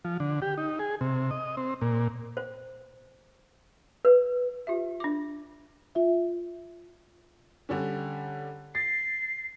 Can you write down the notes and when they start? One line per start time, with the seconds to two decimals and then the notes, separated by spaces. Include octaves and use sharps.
0.05 F3
0.20 D3
0.42 G4
0.58 D#4
0.79 G#4
1.01 C3
1.31 D#5
1.57 C4
1.81 A#2
2.37 C5
4.05 B4
4.67 F4 G4 E5
5.00 D4 D6
5.95 F4 E5
7.69 D3 G3 C#4
8.75 A6 C7